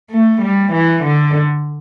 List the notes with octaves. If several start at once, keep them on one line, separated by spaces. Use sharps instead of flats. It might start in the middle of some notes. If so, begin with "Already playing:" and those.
A3
G3
E3
D3